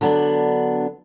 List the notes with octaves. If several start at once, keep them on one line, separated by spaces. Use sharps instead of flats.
D3 F#3 B3 D4